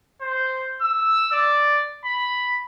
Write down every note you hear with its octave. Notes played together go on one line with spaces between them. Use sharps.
C5
E6
D5
B5